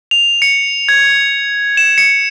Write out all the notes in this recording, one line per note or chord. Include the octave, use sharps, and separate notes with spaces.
F7
C#7
G#6
E7
C#7